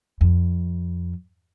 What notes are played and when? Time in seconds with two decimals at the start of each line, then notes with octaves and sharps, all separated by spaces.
0.21 F2